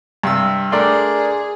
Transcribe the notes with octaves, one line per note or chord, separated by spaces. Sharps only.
G2 C3 E6
A3 D4 G#4 A#4 D5 C6